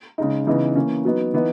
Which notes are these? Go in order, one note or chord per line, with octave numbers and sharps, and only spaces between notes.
C#3 G#3 D#4
C#3 E3 B3 D#4
E3 A#3 C#4
F#3 B3 D#4
E3 B3 D#4